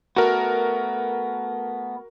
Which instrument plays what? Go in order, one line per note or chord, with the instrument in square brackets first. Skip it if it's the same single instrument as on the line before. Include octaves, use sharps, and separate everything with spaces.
[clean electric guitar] A3 B3 [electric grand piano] F#4 A#4